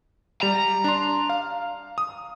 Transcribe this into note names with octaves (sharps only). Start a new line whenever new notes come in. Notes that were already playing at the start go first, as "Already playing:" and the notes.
G3 A#5
D4 C6
F5
D#6